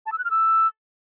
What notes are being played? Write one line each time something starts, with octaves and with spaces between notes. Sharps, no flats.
A5
E6
F#6
F6
E6